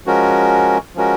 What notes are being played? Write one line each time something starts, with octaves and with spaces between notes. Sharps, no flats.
F3 G#3 C#4 F#4 A#4
F3 G#3 C#4 F#4 A#4